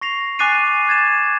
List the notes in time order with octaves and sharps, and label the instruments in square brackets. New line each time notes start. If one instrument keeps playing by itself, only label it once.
[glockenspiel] C#6 A#6 C7 F7
G#5 D6 F#6 A6 C7 D#7
F#6 G#6 A6 E7